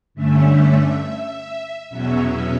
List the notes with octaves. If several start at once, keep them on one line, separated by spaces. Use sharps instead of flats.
G2 D3 A3 C#4 E5
E2 B2 F#3 C#4 E5